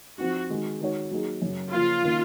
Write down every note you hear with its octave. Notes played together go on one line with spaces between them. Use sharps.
F3 C4 D#4 F#4
D#3 G#3 D#4 F#4
D#3 G#3 D#4 F#4 C#5
F#3 A#3 D#4 G#4
F#2 C#3 F#3
C#3 F3 A#3 F4
D#3 A#3 C#4